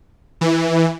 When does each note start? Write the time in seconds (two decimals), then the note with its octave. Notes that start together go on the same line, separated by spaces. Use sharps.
0.41 E3